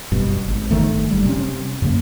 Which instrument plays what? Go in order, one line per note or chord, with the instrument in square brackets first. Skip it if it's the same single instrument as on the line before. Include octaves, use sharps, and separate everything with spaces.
[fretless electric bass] F#1 G2 B2
G#1
G1 D2 D#3 A3
F#1 G3
C3 C#4
F#2 C#3 A#3